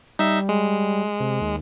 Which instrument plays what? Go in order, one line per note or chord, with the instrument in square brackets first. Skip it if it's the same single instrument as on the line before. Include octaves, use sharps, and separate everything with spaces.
[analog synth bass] G3 [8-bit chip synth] D#4 E5
[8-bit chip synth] G#3
[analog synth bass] C3
D#2